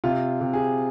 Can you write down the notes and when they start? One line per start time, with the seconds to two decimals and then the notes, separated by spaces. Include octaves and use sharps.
0.04 C3 F4
0.41 C3
0.53 G#4